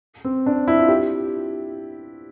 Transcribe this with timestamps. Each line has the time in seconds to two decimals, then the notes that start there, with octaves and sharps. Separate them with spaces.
0.25 C4
0.46 D4
0.68 E4
0.79 F4
0.89 G4